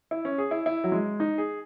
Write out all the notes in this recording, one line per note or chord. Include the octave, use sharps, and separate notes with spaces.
E4
C#4
G#4
E4
E4
F#3
G#3
D#4
G#4